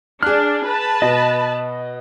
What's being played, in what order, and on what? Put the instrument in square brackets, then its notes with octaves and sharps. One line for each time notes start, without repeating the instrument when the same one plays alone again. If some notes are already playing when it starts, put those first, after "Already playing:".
[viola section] D4 [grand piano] G#4 F#6 [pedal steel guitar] F6
[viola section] B4 A5
[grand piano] B2 [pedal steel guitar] D#5